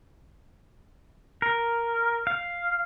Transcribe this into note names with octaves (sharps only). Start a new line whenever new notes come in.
A#4
F5